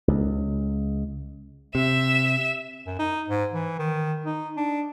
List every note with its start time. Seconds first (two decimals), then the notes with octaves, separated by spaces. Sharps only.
0.08 C#2
1.75 C3 E5 E7
2.86 F#2
2.99 D#4
3.29 G#2
3.53 E3
3.79 D#3
4.26 D#4
4.57 D4